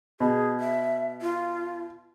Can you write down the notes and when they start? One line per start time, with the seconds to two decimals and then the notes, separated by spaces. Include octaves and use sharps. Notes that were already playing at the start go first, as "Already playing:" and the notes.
0.20 B2 G#4
0.60 E5
1.22 F4